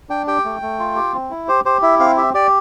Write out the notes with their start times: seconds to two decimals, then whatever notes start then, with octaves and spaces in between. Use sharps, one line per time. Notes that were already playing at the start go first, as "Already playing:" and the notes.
0.09 D4 G5
0.27 G4 G5
0.45 A3
0.62 A3
0.79 F4
0.96 G4
1.14 C4
1.31 E4
1.48 G4 C5
1.65 G4 C5
1.82 E4 E5
2.00 C4 F5
2.17 G4 E5
2.34 G4 D5